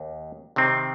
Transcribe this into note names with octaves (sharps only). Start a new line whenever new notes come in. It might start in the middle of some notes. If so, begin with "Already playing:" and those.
Already playing: D#2
C3 D#3 C4 D#4